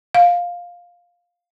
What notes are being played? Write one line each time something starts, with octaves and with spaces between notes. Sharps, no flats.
F5